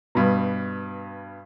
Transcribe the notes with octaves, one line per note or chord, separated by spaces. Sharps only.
G2 B2